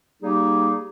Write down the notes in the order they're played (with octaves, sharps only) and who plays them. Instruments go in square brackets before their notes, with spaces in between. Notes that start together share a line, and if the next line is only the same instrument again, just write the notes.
[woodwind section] G3 A#3 D#4 G4 G#4